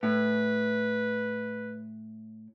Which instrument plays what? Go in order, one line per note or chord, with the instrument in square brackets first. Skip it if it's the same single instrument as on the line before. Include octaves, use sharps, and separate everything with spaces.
[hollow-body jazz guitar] A2 [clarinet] B4